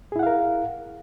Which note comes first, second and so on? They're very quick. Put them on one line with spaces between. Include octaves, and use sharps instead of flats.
G#4 E4 F#5 F5 A#4